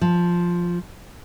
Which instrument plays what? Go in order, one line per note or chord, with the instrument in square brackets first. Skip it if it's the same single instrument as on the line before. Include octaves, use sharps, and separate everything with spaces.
[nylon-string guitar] F3